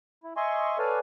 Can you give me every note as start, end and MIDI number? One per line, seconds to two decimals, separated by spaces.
0.24 0.33 64
0.37 0.78 75
0.37 0.78 76
0.37 0.78 80
0.37 0.78 84
0.37 0.78 85
0.79 0.99 69
0.79 0.99 71
0.79 0.99 73
0.79 0.99 74
0.79 0.99 77
0.79 0.99 80